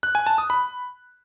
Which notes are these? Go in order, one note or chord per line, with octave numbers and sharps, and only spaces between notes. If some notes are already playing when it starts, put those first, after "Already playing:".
F#6
G#5
A5
D#6
B5